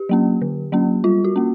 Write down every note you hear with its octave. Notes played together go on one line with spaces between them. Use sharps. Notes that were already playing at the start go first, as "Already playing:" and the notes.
Already playing: G4
F#3 A#3 C#4
D3
F#3 A#3 C#4
G3 F4
F#4
A#3 C#4